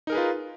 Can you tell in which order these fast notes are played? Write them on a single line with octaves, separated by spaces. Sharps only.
D#4 A#4 G#4 B4 F4